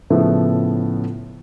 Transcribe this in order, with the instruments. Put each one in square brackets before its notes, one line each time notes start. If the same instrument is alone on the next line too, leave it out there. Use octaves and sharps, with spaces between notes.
[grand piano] A2 C#3 F3 A3 B3